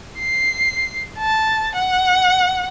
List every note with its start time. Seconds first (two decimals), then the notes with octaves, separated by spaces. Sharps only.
0.18 C7
1.18 A5
1.75 F#5